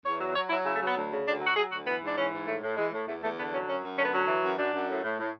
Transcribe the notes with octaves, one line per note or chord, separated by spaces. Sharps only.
E2 C#5
F#3
F#3 C#5
F#3 E4
C#3 E4
A3
F#3 B3
D2
C#3
D2 D4
F#3
F#4
F#3 G#4
D2 F#4
E3 B3
G#2 D4
E3 C#4
G#2
A2 A3
A2
E3 G#3
A2
E2 A3
E2 A3
D3 B3
F#3 C#4
F#2 C#4
F#2
D3 C#4
B3
F#3 C#4
E3
F#2
F#2 D4
F#2
A2
A2
A2